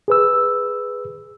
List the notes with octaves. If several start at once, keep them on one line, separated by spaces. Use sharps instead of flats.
G#4 B4 E6